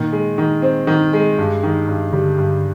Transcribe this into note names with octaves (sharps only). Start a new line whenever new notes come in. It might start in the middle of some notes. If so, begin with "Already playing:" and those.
Already playing: A#2 D#3
G#3
D#3
C4
D#3
G#3
G2
D#3
G2
D3 G3
G2